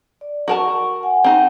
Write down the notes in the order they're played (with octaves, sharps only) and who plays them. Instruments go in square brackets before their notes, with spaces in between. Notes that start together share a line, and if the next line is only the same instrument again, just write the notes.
[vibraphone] D5
[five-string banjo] F#4 A#4 A5 [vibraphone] C#6
[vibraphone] F#5 G#5
[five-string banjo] C4 D#4